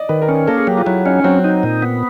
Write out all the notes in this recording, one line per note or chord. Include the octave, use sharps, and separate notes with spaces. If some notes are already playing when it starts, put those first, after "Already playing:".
Already playing: D5 D#5
D#3 B4
A#4
C#4
A#3 A4
G#4
F#3 G4
F4
F#3 E4
C#4 D#4
F#3 C4
D#4
A#2
B3